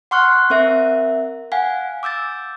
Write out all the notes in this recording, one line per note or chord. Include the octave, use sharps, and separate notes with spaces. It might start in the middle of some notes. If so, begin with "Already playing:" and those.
F#5 C6 C#6 F6 F#6
C4 A#4 E5
F5 F#5 G#5
D6 E6 G6 A6